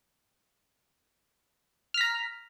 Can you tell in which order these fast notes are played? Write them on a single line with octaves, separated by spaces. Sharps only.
F6 B6 A#5